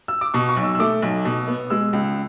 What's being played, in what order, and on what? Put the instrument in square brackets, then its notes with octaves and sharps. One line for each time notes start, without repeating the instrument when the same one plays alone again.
[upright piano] E6
D6
B2 C#6
C#6
B1
E6
E6
A3 D6
B1
B2
B3
G#3 E6
C#2